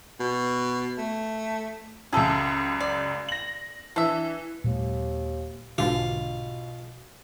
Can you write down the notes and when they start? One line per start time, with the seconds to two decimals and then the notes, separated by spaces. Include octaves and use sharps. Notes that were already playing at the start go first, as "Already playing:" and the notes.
0.20 B2
0.98 A3
2.13 C#2 F#2 G#4 A4 E5
2.80 D5
3.29 A#6 F#7
3.96 E3 D4 E5
4.64 D#2 A#2 F#3 G#3
5.78 B1 G#2 B2 D3 F4